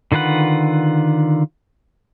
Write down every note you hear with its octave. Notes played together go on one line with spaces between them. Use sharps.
D3 D#3 F4 B4 F#5